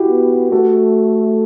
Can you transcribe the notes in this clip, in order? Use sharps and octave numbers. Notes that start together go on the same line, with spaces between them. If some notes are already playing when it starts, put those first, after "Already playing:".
Already playing: E4 F#4 G4
B3
A3 F#4 A4